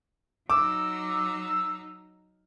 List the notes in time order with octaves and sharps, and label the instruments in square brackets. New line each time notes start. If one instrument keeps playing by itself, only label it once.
[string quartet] F#3 D#4 [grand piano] D6 [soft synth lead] E6